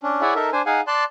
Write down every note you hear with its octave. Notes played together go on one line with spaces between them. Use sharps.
C#4 D4
E4 G#4 C#5 D5 E5 F#5
D#4 A4 A#4 E5
D4 C5 G#5
D#4 G#4 F5 F#5 G#5
D5 A5 C6 F#6